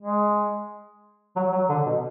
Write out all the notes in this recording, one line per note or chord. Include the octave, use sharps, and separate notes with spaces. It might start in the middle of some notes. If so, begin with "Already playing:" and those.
G#3
F#3
F#3
D3
B2